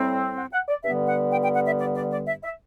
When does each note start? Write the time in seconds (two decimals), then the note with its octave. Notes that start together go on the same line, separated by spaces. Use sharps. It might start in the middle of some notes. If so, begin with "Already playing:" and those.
Already playing: A2 G3 C4
0.36 F#5
0.53 F#5
0.68 D5
0.84 G2 D3 G3 B3 E5
1.08 F#5
1.32 G5
1.45 G5
1.56 F#5
1.68 E5
1.80 D5
1.96 D5
2.12 D5
2.28 E5
2.44 E5